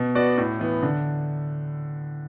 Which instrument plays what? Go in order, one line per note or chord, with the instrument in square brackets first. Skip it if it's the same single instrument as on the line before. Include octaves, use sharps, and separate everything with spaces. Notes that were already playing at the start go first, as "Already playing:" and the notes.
Already playing: [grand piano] B2
B3 F#4 D5
A2
E3 B3
D3